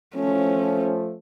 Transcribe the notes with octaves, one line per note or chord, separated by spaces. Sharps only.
F3 A3 C#4